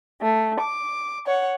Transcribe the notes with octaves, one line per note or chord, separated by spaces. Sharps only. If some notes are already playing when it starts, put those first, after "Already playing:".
A3
D6
C#5 F#5